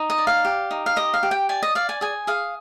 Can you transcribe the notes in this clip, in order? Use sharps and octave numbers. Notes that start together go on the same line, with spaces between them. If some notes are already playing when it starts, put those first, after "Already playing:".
Already playing: D#4
D#5
D5
F5
G4
D#4
F5
G4 D#5
F5
G4
G5
D5 G#5
D#5
D5 F5
G#5
G#4 G#5
G#4 F5